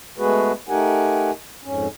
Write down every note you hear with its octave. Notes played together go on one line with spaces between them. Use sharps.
G#3 A3 B3 F#4 G#4 B4
A3 D#4 G4 A#4 F#5 G#5
F2 G#2 C#4